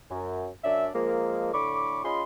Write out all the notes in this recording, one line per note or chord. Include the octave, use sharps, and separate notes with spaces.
F#2
F#2 C#4 D4 D5 E5
F3 G#3 A#3
A2 D3 B5 C#6 D6
C#4 F4 G#4 D#5 B5 C6